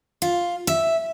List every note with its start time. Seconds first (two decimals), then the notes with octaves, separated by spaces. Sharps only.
0.22 F4
0.67 E5